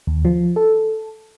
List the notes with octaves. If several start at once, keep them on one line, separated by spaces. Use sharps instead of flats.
D#2
F3
A4